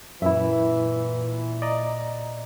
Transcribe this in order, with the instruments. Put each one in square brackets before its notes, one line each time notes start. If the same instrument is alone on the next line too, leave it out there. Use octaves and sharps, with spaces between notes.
[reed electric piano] F#2 E4 [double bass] A#2 [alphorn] E3 [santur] E5
[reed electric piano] D5 D#5 A#5